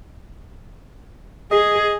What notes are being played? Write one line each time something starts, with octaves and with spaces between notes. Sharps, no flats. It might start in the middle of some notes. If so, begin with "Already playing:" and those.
G#4 D#5